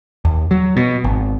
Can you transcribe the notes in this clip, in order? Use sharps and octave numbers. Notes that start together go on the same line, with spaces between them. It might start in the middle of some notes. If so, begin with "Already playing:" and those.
D#2
F#3
B2
G#1